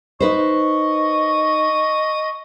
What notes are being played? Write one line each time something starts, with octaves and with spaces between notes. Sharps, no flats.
D#4 B4 C5 D#5 C#6